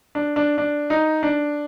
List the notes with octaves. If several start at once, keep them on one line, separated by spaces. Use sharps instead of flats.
D4
D4
D4
D#4
D4